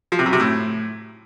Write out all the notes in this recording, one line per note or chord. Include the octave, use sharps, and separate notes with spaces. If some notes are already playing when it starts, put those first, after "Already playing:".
F3
C3
F#2
C3
A2